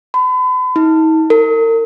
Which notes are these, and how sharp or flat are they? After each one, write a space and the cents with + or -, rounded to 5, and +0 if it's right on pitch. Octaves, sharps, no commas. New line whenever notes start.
B5 +40
D#4 +45
A#4 -40